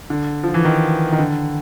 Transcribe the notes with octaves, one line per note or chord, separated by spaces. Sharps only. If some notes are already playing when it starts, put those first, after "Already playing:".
D3
F3
E3
D#3
D#3
D3